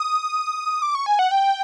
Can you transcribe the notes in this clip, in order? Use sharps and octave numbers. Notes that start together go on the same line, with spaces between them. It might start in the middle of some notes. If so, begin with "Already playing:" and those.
Already playing: D#6
D6
C#6
G#5
F#5
G5